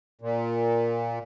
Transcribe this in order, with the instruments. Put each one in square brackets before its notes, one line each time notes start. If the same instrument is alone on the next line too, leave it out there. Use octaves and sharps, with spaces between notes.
[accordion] A#2